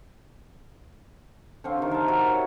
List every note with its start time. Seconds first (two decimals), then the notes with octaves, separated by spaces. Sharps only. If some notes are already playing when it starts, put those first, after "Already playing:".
1.64 D3 C4 F5 C#6
1.79 C3 D#3
1.91 A#4 A5
2.08 E4 F#4 A#4
2.27 C#5